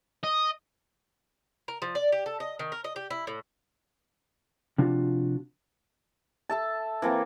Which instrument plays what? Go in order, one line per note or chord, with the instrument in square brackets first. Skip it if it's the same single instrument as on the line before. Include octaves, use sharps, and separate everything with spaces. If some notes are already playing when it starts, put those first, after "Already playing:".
[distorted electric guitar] D#5
[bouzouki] A#4
F3
D5
G4
A4
D#5
D#3
A#4
D#5
G4
E4
A2
[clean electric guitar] C3 F3 D4 F4 F#4
[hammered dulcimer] A4 E5 A5
E3 A#3 C4 A4